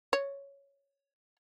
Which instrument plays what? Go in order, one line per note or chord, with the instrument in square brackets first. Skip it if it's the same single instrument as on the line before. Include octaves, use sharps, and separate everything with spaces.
[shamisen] C#5